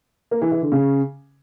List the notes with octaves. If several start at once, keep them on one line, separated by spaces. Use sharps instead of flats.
A#3
E3
E3
D3
C#3